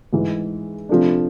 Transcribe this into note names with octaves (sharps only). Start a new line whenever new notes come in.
G#2 E3 G#3
C3 F3 A3 D4